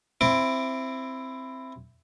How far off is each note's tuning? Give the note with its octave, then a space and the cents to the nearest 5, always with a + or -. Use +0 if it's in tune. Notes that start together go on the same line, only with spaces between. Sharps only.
C4 +0 E4 +10 D6 +0